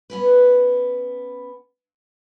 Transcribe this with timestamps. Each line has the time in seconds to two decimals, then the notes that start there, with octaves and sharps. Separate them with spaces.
0.10 B3 C#4 B4